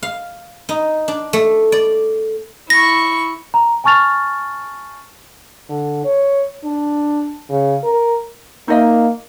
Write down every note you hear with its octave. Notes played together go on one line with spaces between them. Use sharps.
F5
D#4
D4
A3
D5
E4 C#6 A#6
A#5
G#5 A5 C#6 F6 A6 F7
D3
C#5
D4
C#3
A#4
A#3 D#4 D#5 E5